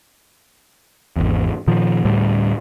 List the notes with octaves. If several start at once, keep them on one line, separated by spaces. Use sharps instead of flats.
G#1 E2
A#2 D#3 F3
D2 A2 G3